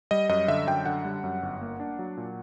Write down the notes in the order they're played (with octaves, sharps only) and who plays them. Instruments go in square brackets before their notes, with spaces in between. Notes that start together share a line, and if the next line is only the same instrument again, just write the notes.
[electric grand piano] G3 D#5
F#2 D#5
D3 E5
F#2 G5
D3 F#5
G3
F#2
G1
A#3
D4
F#3
A#2